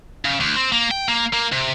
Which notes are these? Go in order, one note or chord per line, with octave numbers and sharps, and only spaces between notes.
C#3
D2
C4
A#3
G5
A#3
A#3
C3